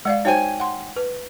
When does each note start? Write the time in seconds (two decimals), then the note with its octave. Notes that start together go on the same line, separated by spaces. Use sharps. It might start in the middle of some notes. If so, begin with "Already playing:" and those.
0.05 G#3 D5 F5 F#5
0.25 D#4 F#4 C5 C#5 G5 G#5
0.60 F#5 C6
0.96 B4